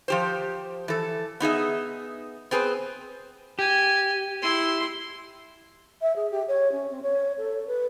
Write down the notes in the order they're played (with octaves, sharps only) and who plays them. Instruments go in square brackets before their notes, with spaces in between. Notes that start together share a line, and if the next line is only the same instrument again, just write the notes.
[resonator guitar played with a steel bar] F3 G4 C5
E3 A4
B3 D#4 G#4 E5
B3 C4 G#4 B4 C5
[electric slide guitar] G4 [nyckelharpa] G#5
[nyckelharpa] E4 C6
[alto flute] E5
G#4
G4
C#5
C#4
C4
C#5
A4
B4